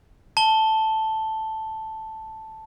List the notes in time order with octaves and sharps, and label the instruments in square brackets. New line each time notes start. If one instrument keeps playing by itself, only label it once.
[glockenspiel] A5 G7